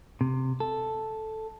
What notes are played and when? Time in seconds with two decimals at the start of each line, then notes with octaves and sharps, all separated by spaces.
0.21 C3
0.60 A4